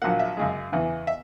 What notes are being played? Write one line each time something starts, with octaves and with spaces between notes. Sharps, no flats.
A#1 A#2 F#3 A#3 F#5
E5
F#2 C#3 G#3
E2 C#3 E3
E5